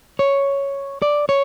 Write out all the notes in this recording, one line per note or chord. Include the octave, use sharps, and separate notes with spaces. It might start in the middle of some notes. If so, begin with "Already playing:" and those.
C#5
D5
C#5